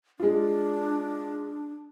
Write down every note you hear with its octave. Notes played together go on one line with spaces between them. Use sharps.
G#3 D4 F4